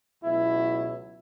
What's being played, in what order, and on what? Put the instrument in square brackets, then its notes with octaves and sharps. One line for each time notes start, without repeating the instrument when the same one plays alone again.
[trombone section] C#2 B2 F#3 E4